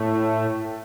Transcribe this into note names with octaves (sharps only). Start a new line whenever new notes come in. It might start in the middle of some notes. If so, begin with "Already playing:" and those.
Already playing: A2 A3